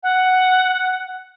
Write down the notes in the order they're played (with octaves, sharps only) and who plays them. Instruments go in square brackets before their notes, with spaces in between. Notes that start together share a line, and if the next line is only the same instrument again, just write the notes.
[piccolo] F#5